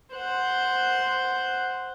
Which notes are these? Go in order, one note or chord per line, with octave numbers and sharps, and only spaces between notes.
C5 F#5